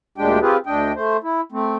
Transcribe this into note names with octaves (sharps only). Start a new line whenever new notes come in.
D2 A#2 G#3 D4 G4 G5
C4 F4 G4 G#4 B4
D2 D4 D#5 G5
A3 C5
E4
A3 C4